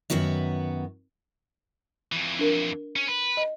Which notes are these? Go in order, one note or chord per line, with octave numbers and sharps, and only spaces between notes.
F#2 D#3 B3 F#4 E5
F2 E3
D4 A#4
C#4
B4
D#5